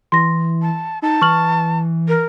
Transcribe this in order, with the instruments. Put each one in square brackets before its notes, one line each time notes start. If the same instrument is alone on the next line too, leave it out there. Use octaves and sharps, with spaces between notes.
[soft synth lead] E3 [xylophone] C6 A#6
[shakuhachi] A5
[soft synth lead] D#4 [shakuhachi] A5
[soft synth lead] E3 [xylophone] C#6 F6 F#7
[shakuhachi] A#4